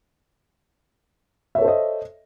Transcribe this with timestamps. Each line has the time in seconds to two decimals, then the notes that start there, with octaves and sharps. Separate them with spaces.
1.55 E5
1.58 C#5
1.61 A4
1.65 C5
1.68 D#5